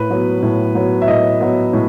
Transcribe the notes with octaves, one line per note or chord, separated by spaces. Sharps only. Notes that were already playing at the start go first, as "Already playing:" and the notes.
Already playing: A2 B4
F#3 B3
A2
F#3 B3
E5
A2 D#5
F#3 B3
A2